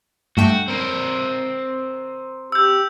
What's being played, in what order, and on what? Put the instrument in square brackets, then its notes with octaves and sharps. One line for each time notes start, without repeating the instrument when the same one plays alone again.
[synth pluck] G2 A3 G5 [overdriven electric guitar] F#4
[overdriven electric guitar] C4 A#4
[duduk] G4 [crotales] E6 G6